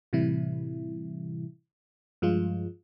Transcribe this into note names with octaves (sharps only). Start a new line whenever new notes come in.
A2 C3 E3 G3 E4
G2 F3 G#3 F4